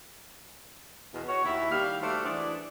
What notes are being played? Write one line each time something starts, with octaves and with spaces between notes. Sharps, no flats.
E2 B2
F#4 C#5
D#2 E4
D#2 G3 G4 F5
G3 A3 F#4 C5 D5
E3 D4 G#4 D5